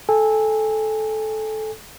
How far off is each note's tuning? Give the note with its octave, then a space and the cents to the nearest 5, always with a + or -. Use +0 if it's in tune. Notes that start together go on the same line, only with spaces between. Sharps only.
A4 -15 G#5 -30